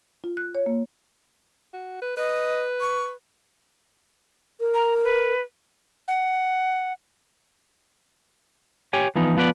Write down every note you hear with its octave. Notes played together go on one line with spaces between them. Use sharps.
F4
F#6
C#5
A#3
F#4
B4
B4 D#5
C#6
A#4
A#5
B4
F#5
G4 C#5 G5 G#5
E3 F3 B3 D#4
F3 B3 B4 D5